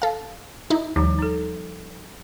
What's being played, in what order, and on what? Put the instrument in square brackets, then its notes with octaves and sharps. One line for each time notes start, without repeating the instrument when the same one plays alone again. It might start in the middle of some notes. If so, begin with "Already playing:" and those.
[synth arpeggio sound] A4 F5
D#4 E4
[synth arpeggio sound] D#2 [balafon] F3 G3 D#4
[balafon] D#4 A4